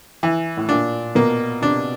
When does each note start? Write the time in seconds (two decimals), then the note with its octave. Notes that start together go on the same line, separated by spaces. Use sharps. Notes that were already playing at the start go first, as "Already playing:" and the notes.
0.23 E3
0.57 A2
0.69 A#2 D4
1.15 B2 A#3
1.62 C3 D4